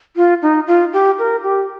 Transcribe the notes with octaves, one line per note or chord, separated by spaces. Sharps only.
F4
D#4
F4
G4
A#4
G4